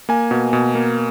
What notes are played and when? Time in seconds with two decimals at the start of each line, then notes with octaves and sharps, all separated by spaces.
0.09 A#3 G#5
0.31 B2
0.53 B2
0.75 A#3